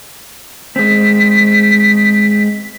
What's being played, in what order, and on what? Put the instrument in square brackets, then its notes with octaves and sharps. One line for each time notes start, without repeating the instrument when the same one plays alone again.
[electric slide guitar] G#3 C4 [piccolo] B6